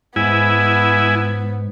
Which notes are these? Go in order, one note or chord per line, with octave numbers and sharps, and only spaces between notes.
G#2 B3 E4 G#5